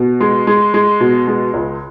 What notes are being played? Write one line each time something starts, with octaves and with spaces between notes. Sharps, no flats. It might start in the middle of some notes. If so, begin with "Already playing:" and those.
Already playing: B2
G#3
G#3
G#3
B2
G#3
C#2